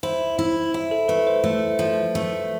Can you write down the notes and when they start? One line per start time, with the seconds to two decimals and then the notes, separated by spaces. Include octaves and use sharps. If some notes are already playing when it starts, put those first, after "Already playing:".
0.03 E4 C5
0.39 E4 E5
0.74 E4
0.91 A4
1.08 A3 B4
1.27 C5
1.44 A3
1.79 F3
2.15 A3